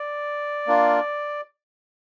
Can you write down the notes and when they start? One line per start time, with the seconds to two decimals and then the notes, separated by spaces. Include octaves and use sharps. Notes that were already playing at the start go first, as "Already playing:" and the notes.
Already playing: D5
0.67 A#3 D4 F4